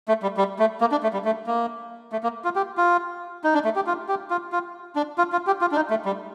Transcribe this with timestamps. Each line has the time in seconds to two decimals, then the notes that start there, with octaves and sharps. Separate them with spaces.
0.08 A3
0.23 G3
0.37 G3
0.59 A3
0.81 A#3
0.92 D4
1.03 A3
1.13 G3
1.25 A3
1.47 A#3
2.12 A3
2.23 A#3
2.44 F4
2.56 G4
2.77 F4
3.44 D#4
3.54 D4
3.64 A3
3.76 G4
3.87 F4
4.08 G4
4.30 F4
4.52 F4
4.96 D4
5.18 F4
5.32 F4
5.47 G4
5.61 F4
5.72 D4
5.76 D#4
5.90 A3
6.05 G3